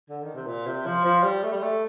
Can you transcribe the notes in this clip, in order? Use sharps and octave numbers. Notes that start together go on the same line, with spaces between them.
D3
D#3
C3
A#2
C3
F3
F3
G3
A3
G3
A3